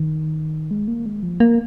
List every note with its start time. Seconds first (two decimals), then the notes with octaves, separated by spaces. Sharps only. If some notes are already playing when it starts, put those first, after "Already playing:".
Already playing: D#3
0.71 G#3
0.88 A#3
1.06 G#3
1.23 F3
1.40 A#3